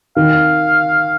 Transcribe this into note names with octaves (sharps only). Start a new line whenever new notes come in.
D#3 F5